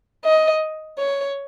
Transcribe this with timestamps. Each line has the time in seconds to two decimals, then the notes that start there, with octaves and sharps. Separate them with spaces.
0.25 D#5
0.99 C#5